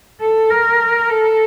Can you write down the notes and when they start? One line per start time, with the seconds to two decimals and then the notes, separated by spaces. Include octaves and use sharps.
0.21 A4
0.51 A#4
1.10 A4